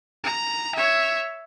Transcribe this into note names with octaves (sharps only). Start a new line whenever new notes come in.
A#5
C#5 E5